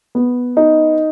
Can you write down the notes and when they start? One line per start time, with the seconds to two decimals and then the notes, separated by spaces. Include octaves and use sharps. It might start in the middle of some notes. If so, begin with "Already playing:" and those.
0.15 B3
0.57 D#4